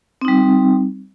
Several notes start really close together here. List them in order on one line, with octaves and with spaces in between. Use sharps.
C4 D#4 G3